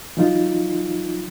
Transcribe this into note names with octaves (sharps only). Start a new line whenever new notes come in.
E3 F#3 D#4 F4